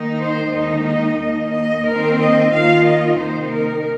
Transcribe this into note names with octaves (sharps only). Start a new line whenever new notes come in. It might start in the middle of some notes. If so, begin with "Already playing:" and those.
Already playing: D#3 A#3 D#4
C5
D#2 D#3 G#3 D#4 D#5
D#5
D#2 D#3 A#3 D#4 D#5
D#5
D#2 D#3 C4 A#4
D#5
D#2 D#3 A#3 F4 F5
D#5
C3 D#3 A#3 D#4 C5
A#4